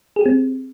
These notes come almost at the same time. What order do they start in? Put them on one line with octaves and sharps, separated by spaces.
G#4 G4 C4